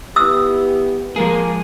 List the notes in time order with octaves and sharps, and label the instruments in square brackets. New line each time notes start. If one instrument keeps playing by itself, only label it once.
[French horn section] B3 E4 G4 [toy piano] C5 D#6 E6
[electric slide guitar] F3 G#3 G#4 [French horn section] A#3